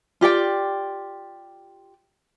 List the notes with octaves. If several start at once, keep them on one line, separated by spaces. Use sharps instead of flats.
F4 G4 D5 G5